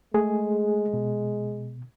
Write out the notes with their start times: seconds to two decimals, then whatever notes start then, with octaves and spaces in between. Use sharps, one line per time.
0.14 G#3 A3 G#4
0.94 B2